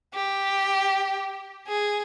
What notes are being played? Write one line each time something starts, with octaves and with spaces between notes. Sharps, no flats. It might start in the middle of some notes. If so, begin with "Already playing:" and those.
G4
G#4